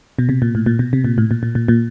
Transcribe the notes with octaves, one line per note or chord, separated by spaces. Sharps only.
B2
C3
A#2
A2
A#2
B2
C3
A#2
A2
A#2
A#2
A#2
A#2